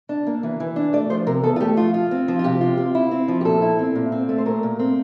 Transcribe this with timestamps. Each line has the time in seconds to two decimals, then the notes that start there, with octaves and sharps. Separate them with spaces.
0.09 D4
0.27 A#3
0.43 E3
0.60 E3
0.76 D4
0.93 A3 D5
1.10 F3 C5
1.27 C3 A#4
1.43 E2 A4
1.56 F4
1.60 A3 G4
1.77 F3 F4
1.94 F4
2.11 C4
2.28 F3
2.39 F4
2.44 C3 G4
2.61 F4
2.77 C4
2.95 E4
3.11 C4
3.28 F3
3.41 G4
3.45 A#2 A4
3.62 E4
3.79 C4
3.95 A#2
4.12 C4
4.29 A3
4.38 C5
4.46 A#2 A#4
4.63 A#2
4.79 C4